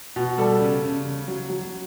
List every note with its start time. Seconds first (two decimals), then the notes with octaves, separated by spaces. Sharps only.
0.16 B2
0.38 G3 A4
0.60 C#3
0.84 C#3
1.05 C#3
1.28 F#3
1.50 F#3